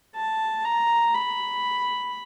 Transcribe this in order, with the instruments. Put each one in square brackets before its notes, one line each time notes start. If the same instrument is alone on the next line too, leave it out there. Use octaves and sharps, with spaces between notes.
[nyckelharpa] A5
A#5
B5